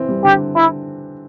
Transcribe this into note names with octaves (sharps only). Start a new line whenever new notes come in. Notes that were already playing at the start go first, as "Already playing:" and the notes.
Already playing: E3 C4
G3
D3 G4
E4